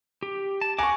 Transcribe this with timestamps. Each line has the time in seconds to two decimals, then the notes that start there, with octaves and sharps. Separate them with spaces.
0.23 G4
0.61 A5
0.79 F#5 G#5 A#5 C#6 D6